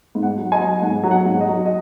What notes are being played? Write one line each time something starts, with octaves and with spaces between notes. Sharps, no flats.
G#2
F#5
F#3
D#5 G#5
F#3
G#2 F#5
F#3
F#5
G#2
D#5
F#3
D#5